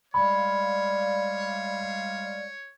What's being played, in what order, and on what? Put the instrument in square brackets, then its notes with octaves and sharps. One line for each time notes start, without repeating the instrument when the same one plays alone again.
[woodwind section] G3 G#3 F5 [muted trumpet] C#5 [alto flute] D5 [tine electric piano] B5